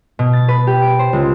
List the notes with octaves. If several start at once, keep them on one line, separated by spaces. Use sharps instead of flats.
B2
A6
B4
G4
D7
C5
C#2